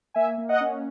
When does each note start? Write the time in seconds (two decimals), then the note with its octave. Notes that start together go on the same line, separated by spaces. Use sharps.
0.14 A#3 E5 G#5
0.38 A#3
0.49 D#5 F#5
0.60 C#4